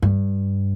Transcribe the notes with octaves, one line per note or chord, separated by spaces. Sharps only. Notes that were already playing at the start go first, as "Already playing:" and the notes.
G2